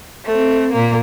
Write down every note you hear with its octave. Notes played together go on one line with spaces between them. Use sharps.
A3 C4
A#2 A#3